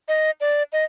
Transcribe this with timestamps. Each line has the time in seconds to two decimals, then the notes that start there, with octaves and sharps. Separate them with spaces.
0.08 D#5
0.41 D5
0.73 D#5